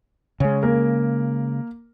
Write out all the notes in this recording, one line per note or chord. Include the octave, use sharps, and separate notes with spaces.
C#3 G#3 C#4
A#3 A#4